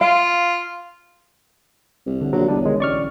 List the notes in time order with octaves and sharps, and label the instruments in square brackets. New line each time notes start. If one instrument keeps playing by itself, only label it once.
[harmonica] F4 [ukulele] F5
[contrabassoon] C2
[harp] D3
[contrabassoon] A#1 [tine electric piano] F#3
[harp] B1 D#5 [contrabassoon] E2 [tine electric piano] G3 D4
[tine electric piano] D#3 G#3
[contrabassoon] A1 [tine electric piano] D5 C#6 F6